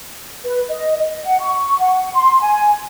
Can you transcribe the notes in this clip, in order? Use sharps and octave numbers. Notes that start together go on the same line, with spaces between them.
B4
D#5
D#5
F#5
C#6
F#5
C6
G#5